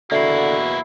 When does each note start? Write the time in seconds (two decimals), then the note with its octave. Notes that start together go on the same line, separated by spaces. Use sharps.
0.11 E2 B2 D3 A#3 E4 F#4 E5 C7